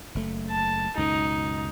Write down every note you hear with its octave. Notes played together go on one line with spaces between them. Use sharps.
F#1 A3
A5
C#2 F#2 B2 D#4